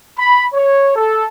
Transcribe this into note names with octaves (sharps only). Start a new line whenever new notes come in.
B5
C#5
A4